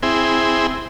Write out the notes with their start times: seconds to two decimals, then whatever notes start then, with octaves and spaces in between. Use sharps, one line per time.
0.03 C4 E4 G#4